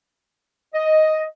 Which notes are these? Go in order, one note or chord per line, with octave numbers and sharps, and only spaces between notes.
D#5